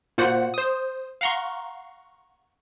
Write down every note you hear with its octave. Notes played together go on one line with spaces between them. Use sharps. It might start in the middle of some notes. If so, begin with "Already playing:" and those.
A#2 A#3 F4 F#4 C5 F#5
C5 D#6
F5 F#5 A#5 C6 C#6